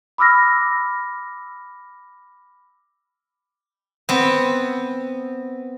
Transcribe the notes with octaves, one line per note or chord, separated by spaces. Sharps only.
B5 D6 E6 F6 A#6
B3 C4